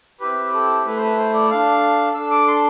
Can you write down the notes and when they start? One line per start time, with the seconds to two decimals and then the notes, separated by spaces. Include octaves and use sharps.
0.20 C4 E4 G4 B4
0.53 A4
0.85 A3 E4 A4 B4
0.97 C5
1.02 B4
1.17 C5
1.33 D5
1.50 D4 A4 F5
2.14 D4 A4 E6
2.31 D6
2.48 C6